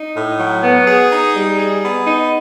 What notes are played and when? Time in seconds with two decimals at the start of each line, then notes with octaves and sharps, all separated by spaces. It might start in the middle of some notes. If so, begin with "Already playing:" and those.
Already playing: D#4
0.15 A2
0.39 F#3
0.64 B3
0.88 G#4
1.11 D#4
1.35 G3
1.59 G#4
1.83 B3
2.07 D#4